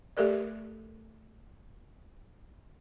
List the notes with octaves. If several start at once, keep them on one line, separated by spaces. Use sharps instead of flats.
A3 G4 A4 A#4 D5